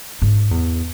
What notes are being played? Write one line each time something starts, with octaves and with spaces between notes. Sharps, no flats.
G#2
E2